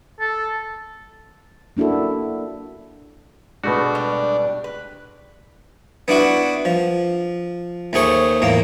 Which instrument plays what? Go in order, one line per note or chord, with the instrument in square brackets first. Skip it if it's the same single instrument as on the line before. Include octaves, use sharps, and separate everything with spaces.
[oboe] A4
[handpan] A#3 D4 E4 F#4 A4
[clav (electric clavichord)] B2 A3 F#4 [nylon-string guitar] G#3 B4 [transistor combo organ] D4
[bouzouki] G3
B4
[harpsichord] B3 D4 E4 F#4
F3
D#2 A3 G#4 C5 C#6
E2 A2 A#3